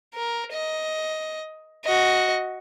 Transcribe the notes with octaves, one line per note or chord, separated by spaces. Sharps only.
A#4
D#5
F#4 D#5